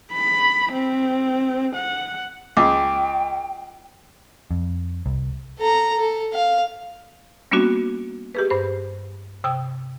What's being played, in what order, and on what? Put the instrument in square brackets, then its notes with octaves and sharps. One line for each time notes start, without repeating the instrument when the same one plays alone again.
[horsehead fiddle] B5
C4
F#5
[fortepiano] C#2 [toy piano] F4 D6 [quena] G5
[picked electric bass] F2
C2
[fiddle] A4 A#5
A4
F5
[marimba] G3 A#3 B3 C#4 D4 F#4
G4 G#4 B4
G2 C5
C3 G5 D#6